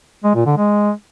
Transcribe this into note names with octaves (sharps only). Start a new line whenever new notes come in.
G#3
A#2
D3
G#3